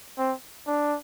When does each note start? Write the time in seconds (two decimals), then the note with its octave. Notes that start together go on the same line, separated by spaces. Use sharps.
0.18 C4
0.67 D4